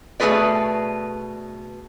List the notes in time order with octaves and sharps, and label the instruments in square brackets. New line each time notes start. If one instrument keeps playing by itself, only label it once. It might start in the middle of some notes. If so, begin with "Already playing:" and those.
[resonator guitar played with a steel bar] B2 A3 G4 G#4 B4 D5